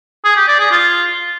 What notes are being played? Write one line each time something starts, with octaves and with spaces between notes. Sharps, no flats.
G#4
G4
D5
G#4
F4